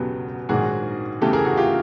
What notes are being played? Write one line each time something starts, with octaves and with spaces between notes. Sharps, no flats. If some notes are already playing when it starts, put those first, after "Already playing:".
Already playing: E1 E2 C#3 F#3 B3 G4 A4
A#1 G#2 D#3 F#3 F#4 G#4
E2 C#3 E3 A3 G4 A4
G#4 A#4
F#4 G#4
F4 G4